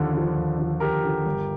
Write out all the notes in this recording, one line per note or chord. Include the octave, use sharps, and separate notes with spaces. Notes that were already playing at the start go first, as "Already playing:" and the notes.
Already playing: D#2 D3 F3
D3 F3
D#2
D3 F3
D#2 G4 A#4
D3 F3
G1